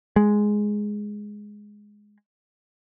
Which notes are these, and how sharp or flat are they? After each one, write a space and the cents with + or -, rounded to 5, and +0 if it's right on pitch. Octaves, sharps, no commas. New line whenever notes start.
G#3 +0